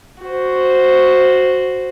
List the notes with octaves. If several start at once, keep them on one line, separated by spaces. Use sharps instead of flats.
F#4 C5